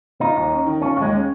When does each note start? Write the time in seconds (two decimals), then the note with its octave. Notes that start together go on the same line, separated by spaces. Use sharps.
0.21 D#4 F4
0.36 D#2
0.51 C#4
0.66 D#3
0.81 C#4 F4
0.96 D#2
1.02 G#3
1.13 C#4